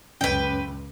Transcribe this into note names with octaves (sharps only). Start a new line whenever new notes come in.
C#2 F#2 C#4 B4 G5